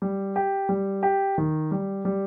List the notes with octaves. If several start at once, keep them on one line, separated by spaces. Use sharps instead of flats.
G3
G4
G3
G4
D#3
G3
G3